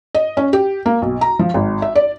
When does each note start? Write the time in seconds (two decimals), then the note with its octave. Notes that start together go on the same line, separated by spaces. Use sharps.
0.15 D#5
0.37 C#4
0.53 G4
0.86 A#3
1.02 B1
1.21 A#5
1.39 F3
1.54 G#1
1.82 E5
1.96 D5